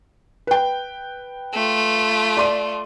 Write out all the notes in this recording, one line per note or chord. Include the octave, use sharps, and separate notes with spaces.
B4 G5
A3 F4
D5 C6 D#7